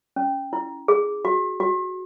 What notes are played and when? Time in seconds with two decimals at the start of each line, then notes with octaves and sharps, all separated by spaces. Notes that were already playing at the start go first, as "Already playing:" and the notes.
0.16 C#4
0.53 E4
0.88 G#4
1.25 F#4
1.60 F#4